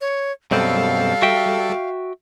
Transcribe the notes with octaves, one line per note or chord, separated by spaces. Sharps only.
C#5
F#2 B2 G3 C4 A4 F5
F#4 E5 G5